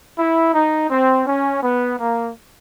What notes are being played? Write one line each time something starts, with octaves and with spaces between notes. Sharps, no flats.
E4
D#4
C4
C#4
B3
A#3